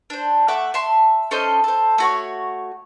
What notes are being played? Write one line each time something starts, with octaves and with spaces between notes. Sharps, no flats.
D4 C5
A3 E5 F#5 D6
E5 A5 C6
C#4 A4 C5 D#5
A4 C5
A3 F#4 C#5